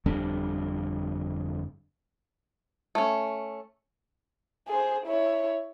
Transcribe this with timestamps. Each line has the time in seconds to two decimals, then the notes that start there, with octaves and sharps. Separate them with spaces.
0.06 G1 F2 G3 D4
2.95 A3 C#4
4.68 G#4 C5
5.06 E4 C#5